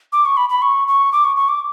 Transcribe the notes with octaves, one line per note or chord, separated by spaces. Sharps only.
D6
C#6
B5
B5
C#6
C#6
D6
C#6
C#6
D6